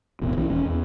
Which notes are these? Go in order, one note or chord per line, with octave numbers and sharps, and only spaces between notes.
E1 A1 B2
A#1 E3 C4 C#4
D#1 C#4
E2